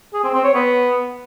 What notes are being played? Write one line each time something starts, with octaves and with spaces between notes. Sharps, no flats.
G#4
C4
C4
C#5
B3